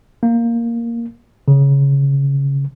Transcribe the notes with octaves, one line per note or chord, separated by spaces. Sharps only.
A#3
C#3